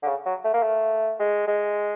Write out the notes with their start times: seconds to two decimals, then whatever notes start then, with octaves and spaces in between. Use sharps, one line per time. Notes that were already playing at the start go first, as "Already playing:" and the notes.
0.03 D3
0.06 C#3
0.26 F#3
0.44 A3
0.54 A#3
0.63 A3
1.20 G#3
1.47 G#3